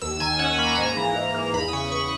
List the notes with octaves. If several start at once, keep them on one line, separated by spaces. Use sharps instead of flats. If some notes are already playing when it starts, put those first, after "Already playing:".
D#2 E6
D#3 G#5
C#4 F#5
A#3 B5
A#5
G#2 G#5
A#5
E3
G#2
A#3
E2 B5
D#6
C#3 C#6
E2 C#6